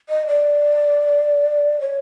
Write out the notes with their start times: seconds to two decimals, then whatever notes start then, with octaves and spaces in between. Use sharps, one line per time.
0.09 D#5
0.27 D5
1.81 C#5